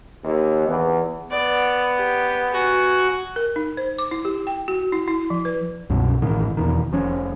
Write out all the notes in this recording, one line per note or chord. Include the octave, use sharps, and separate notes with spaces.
D#2
E2
B3 D5
G4
F#4 G#5
A#4
D#4
C5
D6
E4
G4
G5
F#4
E4
E4
F3
B4
C2 F#2 B2
A1 A2 D#3
E2 B2 D#3
F1 F3 C#4